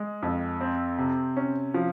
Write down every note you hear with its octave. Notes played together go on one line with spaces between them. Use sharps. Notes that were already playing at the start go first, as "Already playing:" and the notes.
Already playing: G#3
F2
C4
C3
C#4
F3